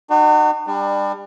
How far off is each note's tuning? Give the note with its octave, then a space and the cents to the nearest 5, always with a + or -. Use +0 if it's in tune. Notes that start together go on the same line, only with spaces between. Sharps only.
D#4 -45 F#4 +20
G3 +30 D4 +25